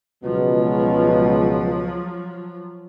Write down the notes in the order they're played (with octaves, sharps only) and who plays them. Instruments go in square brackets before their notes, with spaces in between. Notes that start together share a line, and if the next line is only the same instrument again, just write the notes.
[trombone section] C#2 B2 [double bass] F3 F#3